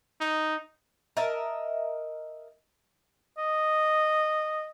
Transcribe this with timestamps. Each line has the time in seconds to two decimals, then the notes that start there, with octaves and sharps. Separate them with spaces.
0.21 D#4
1.17 A#4 D#5 E5 A5
3.38 D#5